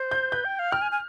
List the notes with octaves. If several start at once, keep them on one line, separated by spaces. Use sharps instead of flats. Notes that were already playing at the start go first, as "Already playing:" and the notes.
Already playing: C5
G6
B4 G6
G5
F5
G5 F6
G#5
G#5